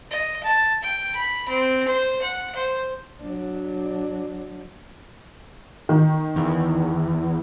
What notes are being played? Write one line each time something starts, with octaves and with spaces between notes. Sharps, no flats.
D#5
A5
G5
B5
C4
C5
F#5
C5
F#3 D4
D#3
E2